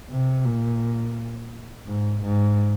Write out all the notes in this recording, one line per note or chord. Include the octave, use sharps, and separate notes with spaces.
C3
A#2
G#2
G#2